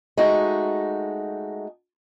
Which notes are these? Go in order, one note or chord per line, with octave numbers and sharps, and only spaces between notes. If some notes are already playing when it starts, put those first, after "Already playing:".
G#3 A3 D#4 F#4